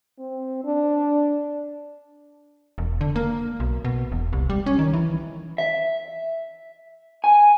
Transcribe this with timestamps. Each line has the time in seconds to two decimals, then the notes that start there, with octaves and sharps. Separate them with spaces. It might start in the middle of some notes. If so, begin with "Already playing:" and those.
0.19 C4
0.65 D4
2.78 E1
3.01 D3
3.16 A#3
3.60 B1
3.84 B2
4.12 E1
4.33 C2
4.50 G3
4.66 C#4
4.79 D#3
4.94 E3
5.58 E5
7.24 G#5